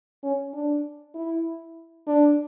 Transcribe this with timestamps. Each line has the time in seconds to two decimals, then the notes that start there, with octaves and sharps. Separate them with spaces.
0.23 C#4
0.54 D4
1.14 E4
2.07 D4